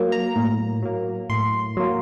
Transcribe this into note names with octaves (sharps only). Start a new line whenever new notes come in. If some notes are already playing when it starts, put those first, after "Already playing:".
Already playing: F#3 A#3
A#5
A2
F#3 A#3
A2 C6
F#3 A#3